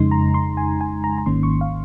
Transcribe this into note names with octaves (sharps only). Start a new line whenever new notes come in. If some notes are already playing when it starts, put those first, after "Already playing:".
Already playing: F2 C#3 G#3 D#4 C6
A#5
C6
G#5
G#5
A#5
A#5
G#1 G#2 D#3 A#3 C#4 C6
C#6
F5